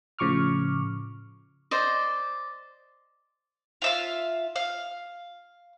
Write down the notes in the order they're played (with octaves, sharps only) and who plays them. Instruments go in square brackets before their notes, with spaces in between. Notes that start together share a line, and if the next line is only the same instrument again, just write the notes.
[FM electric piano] A2 C#3 F3 C#6 D6 F6
[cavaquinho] C5 D5 D#5
[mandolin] F4 E5 F5
F5